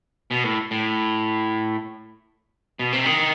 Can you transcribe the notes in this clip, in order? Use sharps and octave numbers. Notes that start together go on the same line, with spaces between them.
B2
A2
A2
B2
C3
D#3